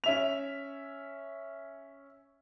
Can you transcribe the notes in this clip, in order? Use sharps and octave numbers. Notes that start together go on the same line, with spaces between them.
C#4 E5 F7